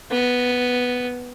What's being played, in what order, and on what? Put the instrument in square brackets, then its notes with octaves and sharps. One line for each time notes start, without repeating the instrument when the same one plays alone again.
[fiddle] B3